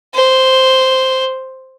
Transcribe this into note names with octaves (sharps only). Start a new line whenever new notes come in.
C5